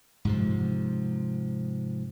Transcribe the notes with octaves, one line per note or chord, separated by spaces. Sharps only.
G#2 C3 F3